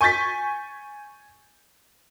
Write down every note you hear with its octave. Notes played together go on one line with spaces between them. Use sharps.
G#5 C#6 G6 A6 B6